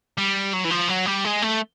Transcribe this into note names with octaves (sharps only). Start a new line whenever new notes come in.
G3
F#3
E3
F3
F#3
G3
G#3
A3